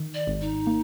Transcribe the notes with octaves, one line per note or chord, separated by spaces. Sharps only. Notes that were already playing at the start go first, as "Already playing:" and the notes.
Already playing: D#3
D5
G#1
D#4
A#3